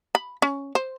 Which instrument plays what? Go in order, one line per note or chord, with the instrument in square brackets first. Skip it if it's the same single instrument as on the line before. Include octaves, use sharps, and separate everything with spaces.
[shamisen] B5
C#4
C5